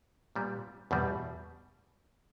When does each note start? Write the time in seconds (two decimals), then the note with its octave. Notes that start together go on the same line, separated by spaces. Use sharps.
0.35 A#2 G3 B3
0.91 E2 B2 G3